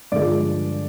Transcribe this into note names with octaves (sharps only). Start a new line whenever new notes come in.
G2 D3 F3 G#3 D5